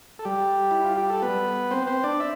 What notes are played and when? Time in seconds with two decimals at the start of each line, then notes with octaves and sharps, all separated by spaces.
0.19 A4
0.25 G3 G4
0.71 E4
0.84 F4
0.97 G4
1.10 A4
1.22 B3 B4
1.71 C4 C5
1.87 C4 C5
2.04 D4 D5
2.20 E5